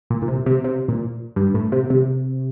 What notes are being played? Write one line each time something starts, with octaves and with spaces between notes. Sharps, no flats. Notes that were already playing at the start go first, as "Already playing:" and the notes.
A#2
A#2
C3
C3
C3
A#2
G2
A2
C3
C3